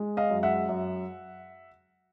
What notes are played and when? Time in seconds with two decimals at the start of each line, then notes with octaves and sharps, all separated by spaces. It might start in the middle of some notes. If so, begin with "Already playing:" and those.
Already playing: G#3
0.17 D#5 F5
0.30 F#2
0.43 E5 F#5
0.69 F#2